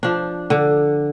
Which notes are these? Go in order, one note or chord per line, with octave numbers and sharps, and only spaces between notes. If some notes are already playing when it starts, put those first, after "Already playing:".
F3 D4
D3